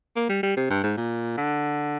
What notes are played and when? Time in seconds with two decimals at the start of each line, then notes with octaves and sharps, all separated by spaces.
0.16 A#3
0.29 G3
0.43 G3
0.57 C3
0.70 G2
0.83 G#2
0.97 A#2
1.37 D3